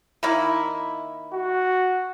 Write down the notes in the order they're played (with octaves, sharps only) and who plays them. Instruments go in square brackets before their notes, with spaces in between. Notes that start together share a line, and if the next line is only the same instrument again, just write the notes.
[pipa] D#3 A#3 E4
[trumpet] F#4